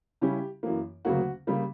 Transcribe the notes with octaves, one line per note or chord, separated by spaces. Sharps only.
C#3 G3 C#4 E4 G4
F#2 E3 A#3
D2 C#3 F#3 A#3 F#4
C#3 G3 A#3